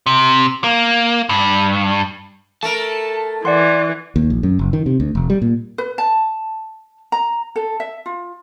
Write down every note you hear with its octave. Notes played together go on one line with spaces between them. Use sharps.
C3
A#3
G2
A3 A#4 A5
E3 D5 F#5 C6
D#2
A#1
F#2
F#1
D#3
C3
D2
F1
G3
A#2
B4
A5
A#5
A4
E5
F4